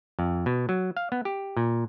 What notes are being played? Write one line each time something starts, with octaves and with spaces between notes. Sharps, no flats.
F2
B2
F#3
F5
B3
G4
A#2